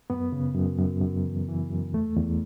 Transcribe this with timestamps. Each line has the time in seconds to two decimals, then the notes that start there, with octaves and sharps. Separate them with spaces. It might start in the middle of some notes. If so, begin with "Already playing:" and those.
0.10 F#2 B3
0.32 C#3
0.55 F#2
0.79 F#2
1.02 F#2
1.25 E3
1.48 E3
1.70 F#2
1.93 E2 A3
2.16 E2